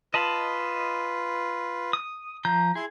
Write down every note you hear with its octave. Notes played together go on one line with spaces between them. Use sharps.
F4 B4 D#5 A5 B5
D#6
F3 A#5 G6
E4 G#4 C6